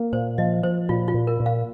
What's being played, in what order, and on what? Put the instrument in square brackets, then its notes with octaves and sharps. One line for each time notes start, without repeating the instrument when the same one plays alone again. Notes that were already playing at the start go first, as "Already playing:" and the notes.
Already playing: [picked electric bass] A#3
[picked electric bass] A#2 [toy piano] C5
[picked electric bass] F3 [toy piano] D#5
[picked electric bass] F3 [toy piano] C5
[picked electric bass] A#2 [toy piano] F4
[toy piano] F4
[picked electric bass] A#2
[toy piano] A#4
[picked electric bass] A#2
[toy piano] F5